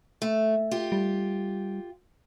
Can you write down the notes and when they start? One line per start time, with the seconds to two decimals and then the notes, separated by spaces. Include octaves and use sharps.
0.22 A3
0.71 F4 G4
0.92 G3